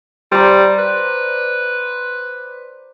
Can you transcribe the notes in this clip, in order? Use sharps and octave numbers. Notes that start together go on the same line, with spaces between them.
G3 C5 D5 A#5
B4